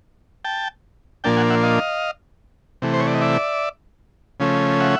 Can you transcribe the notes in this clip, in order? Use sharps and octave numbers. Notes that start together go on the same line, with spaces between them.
G5 A5
A#2 F3 A#3 D4 G5 A5
F#5 G#5
E5 F#5
D#5 F5
C3 E3 A3
C5
C#5
D5
D#5
D5 E5
C#3 F3 A3 C#4
E5 F#5